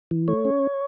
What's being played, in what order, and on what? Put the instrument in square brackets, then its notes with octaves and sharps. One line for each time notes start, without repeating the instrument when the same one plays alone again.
[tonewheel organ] E3
A3 C#5
C#4